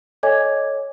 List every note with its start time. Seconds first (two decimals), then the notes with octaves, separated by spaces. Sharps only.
0.23 A4 C#5 D#5 G#5 D6 G#6